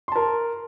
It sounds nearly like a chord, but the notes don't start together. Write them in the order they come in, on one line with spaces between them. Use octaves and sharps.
C6 A5 A#4